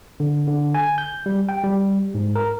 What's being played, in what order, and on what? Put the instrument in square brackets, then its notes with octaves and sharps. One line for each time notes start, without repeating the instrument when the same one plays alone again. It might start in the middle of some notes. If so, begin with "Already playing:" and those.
[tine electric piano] D3
D3
G#5
G6
G3
G5
G3
G#2
A#4